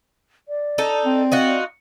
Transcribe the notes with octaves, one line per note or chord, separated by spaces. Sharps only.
D5
D#4 A4
C4
D#4 F4 F#4